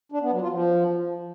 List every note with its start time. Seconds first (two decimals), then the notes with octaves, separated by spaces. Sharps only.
0.12 D4
0.22 B3
0.31 F#3
0.41 F4
0.51 F3